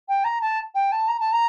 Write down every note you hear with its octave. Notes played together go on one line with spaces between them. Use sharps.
G5
A#5
A5
G5
A5
A#5
A5
A#5